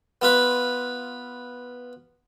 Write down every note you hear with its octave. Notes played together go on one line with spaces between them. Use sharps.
B3 F4 B4